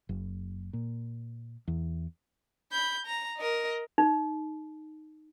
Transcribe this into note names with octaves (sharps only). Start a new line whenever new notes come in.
F#1
A#2
E2
B5 G6
A#5
A#4 D#5
D#4